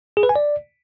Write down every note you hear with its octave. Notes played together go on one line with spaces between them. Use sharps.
G#4
B4
G#5
D5